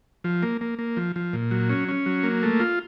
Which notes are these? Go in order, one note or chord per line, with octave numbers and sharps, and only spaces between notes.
F3
A#3
A#3
A#3
F3
F3
A#2
F#3
C#4
C#4
F#3
A#3
A3
F4